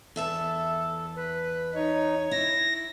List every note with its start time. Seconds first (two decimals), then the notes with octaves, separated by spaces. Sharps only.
0.16 E2 A4 E5 A5
1.16 B4
1.75 D#4 C#5
2.31 E4 A#6